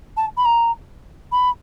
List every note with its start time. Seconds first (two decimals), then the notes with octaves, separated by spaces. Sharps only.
0.17 A5
0.37 B5
0.45 A#5
1.32 B5